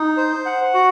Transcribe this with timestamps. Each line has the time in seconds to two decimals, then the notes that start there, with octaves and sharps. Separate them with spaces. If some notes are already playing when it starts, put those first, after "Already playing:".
Already playing: D#4
0.17 C5
0.46 F#5
0.74 F#4